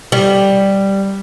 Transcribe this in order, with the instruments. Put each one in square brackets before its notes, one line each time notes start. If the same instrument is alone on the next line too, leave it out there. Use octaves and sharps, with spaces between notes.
[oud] G3